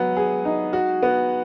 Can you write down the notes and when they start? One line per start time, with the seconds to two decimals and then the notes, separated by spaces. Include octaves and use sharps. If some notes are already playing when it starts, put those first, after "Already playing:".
Already playing: F#3 B3
0.17 G#4
0.45 D#4
0.73 F#4
1.03 B3